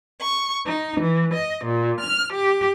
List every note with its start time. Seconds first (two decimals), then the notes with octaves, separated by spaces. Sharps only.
0.20 C#6
0.66 D#4
1.01 E3
1.34 D#5
1.65 A#2
2.00 F6
2.32 G4